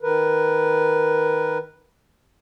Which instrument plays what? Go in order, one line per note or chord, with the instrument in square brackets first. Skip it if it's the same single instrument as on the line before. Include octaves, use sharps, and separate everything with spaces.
[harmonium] D#3 A#4 B4